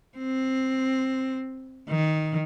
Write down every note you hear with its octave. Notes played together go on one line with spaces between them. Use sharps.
C4
D#3